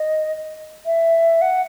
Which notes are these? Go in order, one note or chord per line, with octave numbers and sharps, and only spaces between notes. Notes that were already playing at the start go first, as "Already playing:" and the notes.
Already playing: D#5
E5
F#5